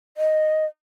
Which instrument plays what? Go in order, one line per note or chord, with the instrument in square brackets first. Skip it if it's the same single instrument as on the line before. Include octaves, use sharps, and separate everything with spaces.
[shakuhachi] D#5